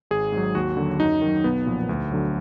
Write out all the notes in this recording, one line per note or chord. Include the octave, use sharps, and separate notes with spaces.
G#1 G#4
G#2 F#3
D#2 F#4
D3 F#3
F#2 D#4
D#3 F#3
B1 B3
A#2 F3
D2
D3 F#3